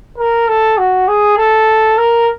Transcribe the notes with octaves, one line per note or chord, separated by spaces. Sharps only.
A#4
A4
F#4
G#4
A4
A#4